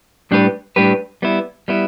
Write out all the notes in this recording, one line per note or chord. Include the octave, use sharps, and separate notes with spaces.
A2 G3 D4 G4 B4
A2 G3 D4 G4 B4
G3 B3 E4
G3 B3 E4